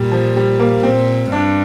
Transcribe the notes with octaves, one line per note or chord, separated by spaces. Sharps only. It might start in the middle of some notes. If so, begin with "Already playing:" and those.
Already playing: A#2 G3
F3
G3
A#3
A#2 C4
G2 D4